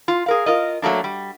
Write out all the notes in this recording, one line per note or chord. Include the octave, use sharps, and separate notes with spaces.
F4
G#4 A#4 F5
F4 A#4 D#5
F#3 A3 A#3 D4
G3